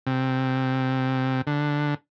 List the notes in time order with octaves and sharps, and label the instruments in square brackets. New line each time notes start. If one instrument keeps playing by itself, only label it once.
[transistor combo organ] C3
D3